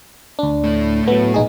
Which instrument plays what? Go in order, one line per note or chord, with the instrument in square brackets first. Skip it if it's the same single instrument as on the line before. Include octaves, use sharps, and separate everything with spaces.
[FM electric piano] D2 D4
[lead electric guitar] A2 A3
[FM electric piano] F#3 B3
A#1 D#4 G#4